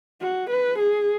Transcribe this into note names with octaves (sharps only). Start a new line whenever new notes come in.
F#4
B4
G#4